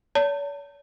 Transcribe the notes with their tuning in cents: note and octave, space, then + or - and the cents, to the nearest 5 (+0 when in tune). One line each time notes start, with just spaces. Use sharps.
C#5 +45 A5 +40